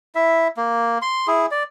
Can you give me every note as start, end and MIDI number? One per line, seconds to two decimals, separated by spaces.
0.15 0.48 64
0.15 0.48 76
0.57 0.98 58
1.02 1.27 84
1.27 1.46 64
1.27 1.46 68
1.51 1.63 74